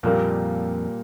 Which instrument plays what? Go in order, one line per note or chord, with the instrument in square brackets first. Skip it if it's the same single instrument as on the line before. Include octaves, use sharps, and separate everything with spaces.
[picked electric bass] F2 [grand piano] A#2 G3 A#3